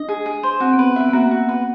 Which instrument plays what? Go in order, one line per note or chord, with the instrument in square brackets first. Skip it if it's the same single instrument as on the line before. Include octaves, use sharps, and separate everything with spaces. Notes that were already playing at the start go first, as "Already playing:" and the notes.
Already playing: [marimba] D4 [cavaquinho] D#5
[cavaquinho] G#4
G#4
C5
[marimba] C4 [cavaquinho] F#4
[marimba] B3
[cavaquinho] B4
[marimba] C4
[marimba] B3 [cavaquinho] E5
[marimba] B3
[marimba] A#3 [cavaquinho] F#4
[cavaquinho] F#4
B4